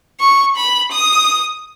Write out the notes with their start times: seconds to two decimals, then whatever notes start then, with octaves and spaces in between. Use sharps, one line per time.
0.20 C#6
0.57 B5
0.91 D#6